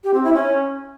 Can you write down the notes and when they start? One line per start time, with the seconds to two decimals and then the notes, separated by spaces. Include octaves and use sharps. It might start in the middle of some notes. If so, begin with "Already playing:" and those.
0.04 G4
0.14 C4
0.24 E4
0.34 C#4